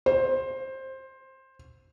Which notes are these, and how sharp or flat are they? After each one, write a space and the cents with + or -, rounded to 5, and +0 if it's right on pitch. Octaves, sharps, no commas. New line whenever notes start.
C5 +15